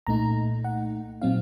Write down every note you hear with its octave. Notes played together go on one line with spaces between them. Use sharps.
C2 A#2 A3 D#4 A#5
F#5
A#2 F#3 C4 D#4 F5